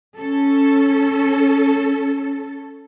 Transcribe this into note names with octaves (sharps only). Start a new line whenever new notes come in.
C#4 A4